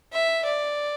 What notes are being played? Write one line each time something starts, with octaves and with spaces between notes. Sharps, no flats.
E5
D5